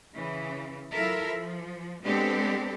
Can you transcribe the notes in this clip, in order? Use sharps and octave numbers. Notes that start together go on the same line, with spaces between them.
C#3 E3
F#3 E4 F4 A4 A#4 E5
F3
G#3 B3 C4 D4 G4 A4